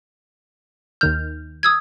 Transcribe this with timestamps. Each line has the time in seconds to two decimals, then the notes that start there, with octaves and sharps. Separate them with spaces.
1.01 D#2 D#3 F6 G6
1.63 D#6 E6 G#6